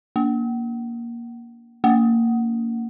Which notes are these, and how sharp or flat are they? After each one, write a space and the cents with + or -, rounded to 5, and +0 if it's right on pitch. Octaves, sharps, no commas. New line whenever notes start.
A#3 +10
A#3 -20